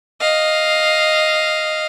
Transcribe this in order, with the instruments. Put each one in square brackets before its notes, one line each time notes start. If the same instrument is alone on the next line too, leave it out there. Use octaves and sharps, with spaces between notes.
[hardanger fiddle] D#5 F5